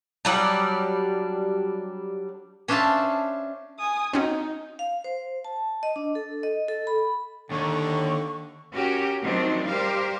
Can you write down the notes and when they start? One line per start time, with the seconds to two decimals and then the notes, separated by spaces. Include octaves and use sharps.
0.25 F#3 G3 D4
2.68 C#4 D4 C5 E5 F5 A5
3.79 G#5 D#6
4.13 C4 C#4 D#4 F#4
4.79 F5
5.04 C5
5.45 A5
5.83 D#5
5.96 D4
6.15 A4
6.43 D#5
6.68 A4
6.87 B5
7.51 D#2 D3 C#6
8.72 C#4 F#4 G4 A#4
9.22 D#3 F3 F#3 C4 D4
9.66 G3 G4 A#4 C5 F5